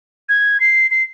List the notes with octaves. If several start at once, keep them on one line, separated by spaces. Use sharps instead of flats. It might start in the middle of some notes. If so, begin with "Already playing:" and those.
G#6
C7
C7